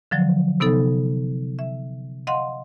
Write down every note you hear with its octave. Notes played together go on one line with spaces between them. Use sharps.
D3 F3 F#3
C3 B3 D#4 A4
E5
D#5 F5 F#5 C6